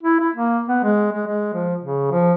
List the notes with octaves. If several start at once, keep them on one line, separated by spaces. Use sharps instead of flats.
E4
E4
A#3
B3
G#3
G#3
G#3
F3
C#3
F3